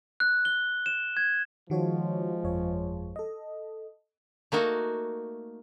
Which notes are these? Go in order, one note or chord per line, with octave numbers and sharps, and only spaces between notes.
F#6
G7
E7
G#6
D#3 F3 G#3 F#4 C#5
G1 F2 C#5
A4 D#5
A3 A#3 D#4 F#4